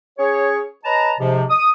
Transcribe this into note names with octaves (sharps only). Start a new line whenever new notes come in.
C#4 G#4 C#5
B4 C#5 D#5 A5 A#5
G#2 C3 F3
D#6